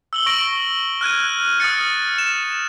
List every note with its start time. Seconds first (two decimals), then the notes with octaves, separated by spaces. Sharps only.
0.13 E6 F#7 G7
0.26 C#6 E6 A#6 D7 F#7
1.01 F6 F#6 G#6 D#7
1.60 D#6 F6 A6 C#7
2.18 E7